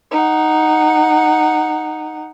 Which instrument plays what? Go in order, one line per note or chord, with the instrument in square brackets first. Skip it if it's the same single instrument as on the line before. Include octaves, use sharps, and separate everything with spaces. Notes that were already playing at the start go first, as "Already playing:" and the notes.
[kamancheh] D#4 F#5